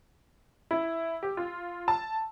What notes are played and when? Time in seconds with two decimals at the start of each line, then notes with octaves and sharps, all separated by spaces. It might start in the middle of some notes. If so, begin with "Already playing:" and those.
0.71 E4
1.23 G4
1.37 F4
1.88 A5